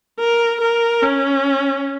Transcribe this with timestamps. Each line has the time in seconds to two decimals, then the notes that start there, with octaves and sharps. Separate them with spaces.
0.20 A#4
0.61 A#4
1.02 C#4